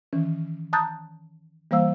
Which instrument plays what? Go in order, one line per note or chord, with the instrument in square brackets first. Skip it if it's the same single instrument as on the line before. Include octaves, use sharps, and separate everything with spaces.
[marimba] D#3 E3 C#4
A5 A#5 D#6 F#6 G6 A6
E3 G3 A#3 C5 F5 E6